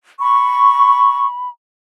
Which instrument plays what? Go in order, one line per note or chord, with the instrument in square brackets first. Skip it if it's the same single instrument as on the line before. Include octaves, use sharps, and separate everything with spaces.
[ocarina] B5 [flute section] C#6